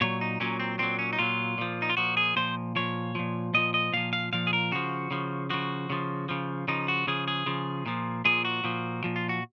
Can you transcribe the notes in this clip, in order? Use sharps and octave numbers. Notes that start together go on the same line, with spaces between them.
A#2 F#3 C#5
D#4
A#2 F#3 C#4
C4
A#2 F#3 C4
C#4
D#4
A#2 F#3 F4
A#2 F3
D#4
F4
A#2 F3 F#4
G#4
A#2 F3 C5
A#2 F3 C#5
A#2 F3
A#2 F3 D#5
D#5
A#2 F3 F5
F5
A#2 F3 F5
G#4
A#4
C#3 F3 F#4
C#3 F3
C#3 F3 F#4
C#3 F3
C#3 F3
C#3 F3 D#4
F#4
C#3 F3 G#4
G#4
C#3 F3
A#2 F3
A#2 F3 G#4
F#4
A#2 F3
A#2 F3
F4
F#4